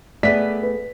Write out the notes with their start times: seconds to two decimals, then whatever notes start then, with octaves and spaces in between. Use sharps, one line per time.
0.23 A3 B3 G#4 D5 E5 B6
0.63 B4